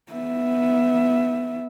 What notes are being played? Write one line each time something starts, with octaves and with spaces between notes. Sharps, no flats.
B3 E5